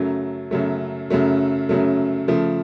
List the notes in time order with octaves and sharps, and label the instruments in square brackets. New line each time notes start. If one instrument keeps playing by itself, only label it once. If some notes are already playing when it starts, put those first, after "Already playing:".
Already playing: [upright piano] F#2 C#3 F#3 A3
F#2 C#3 F#3 A3
F#2 C#3 F#3 A3
F#2 C#3 F#3 A3
C#3 F3 A3